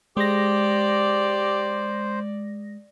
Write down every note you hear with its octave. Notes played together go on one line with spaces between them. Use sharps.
G#3 G4 C5 D5 A#6